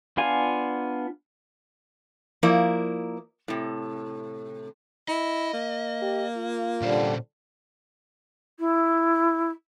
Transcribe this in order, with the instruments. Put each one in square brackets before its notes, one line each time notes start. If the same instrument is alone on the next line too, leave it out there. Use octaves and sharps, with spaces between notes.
[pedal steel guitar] B3 D4 F4 F5 G#5
[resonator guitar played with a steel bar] F3 A#3 E4 A#4 D5
A2 C3
[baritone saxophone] E4 [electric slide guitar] D#5
[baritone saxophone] A#3
[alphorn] G4
F4
[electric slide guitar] A#2 C#4 C5 [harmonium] D3 G3
[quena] E4